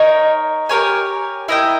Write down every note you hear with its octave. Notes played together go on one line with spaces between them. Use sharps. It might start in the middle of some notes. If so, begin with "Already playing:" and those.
Already playing: D#4 A#4 C#5
G4 A#4 C#5 G#5
E4 A#4 D#5 G5